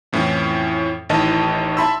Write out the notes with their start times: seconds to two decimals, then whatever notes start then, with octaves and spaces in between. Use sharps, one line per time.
0.13 F2 A2 E3 C#4
1.09 A1 A2 D#3 D#5 A5
1.77 E5 A5 B5 C6 E6